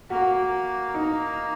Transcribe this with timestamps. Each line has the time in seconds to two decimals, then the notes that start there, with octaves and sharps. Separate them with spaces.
0.10 A#3 F#4
0.94 D#4